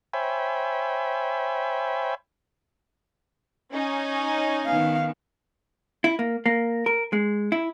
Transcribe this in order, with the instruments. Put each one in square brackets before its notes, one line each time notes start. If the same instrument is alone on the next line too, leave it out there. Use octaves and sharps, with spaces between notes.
[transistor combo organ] C5 C#5 E5 G5 G#5 B5
[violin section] C#4 D#4 G#5
[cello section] D#3 B3 [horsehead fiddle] F5
[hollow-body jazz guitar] E4
A#3
A#3
A#4
G#3
E4